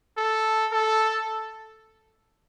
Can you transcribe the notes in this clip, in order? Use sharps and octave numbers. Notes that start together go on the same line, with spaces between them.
A4
A4